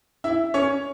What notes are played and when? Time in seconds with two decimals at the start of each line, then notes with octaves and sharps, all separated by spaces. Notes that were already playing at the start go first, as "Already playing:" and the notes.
0.24 E4 E5
0.54 C#4 C#5